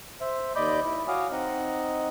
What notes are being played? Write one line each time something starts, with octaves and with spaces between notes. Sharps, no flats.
C5 E5
D#2 D5 D#5 B5 D6 G6
E4
F#4 C#5 F5 G#5 D6 D#6
C4 D#4 D#5 F#5